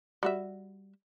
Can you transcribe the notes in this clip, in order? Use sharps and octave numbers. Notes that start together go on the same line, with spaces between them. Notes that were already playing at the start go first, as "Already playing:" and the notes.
G3 F#4 E5